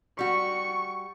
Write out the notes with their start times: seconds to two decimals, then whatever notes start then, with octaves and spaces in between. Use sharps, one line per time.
0.19 G3 F#4 C#6